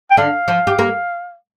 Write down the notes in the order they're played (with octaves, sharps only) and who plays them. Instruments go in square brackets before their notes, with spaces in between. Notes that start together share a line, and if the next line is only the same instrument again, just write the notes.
[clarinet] G5
[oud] D3 D4 [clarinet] F5
[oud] F3 F4
G4
A#3 A#4